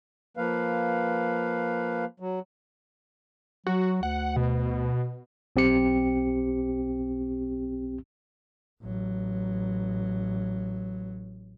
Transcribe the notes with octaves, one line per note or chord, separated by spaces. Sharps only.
F3 A#3 B4 F5
F#3
F#3 F#4
D2 F#5
B2
B1 C4 G4 C#7
A1 F#3